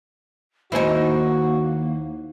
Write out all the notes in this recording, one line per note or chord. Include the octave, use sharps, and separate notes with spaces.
D#2 A#3 D#4 E4 F#4 C5 G#5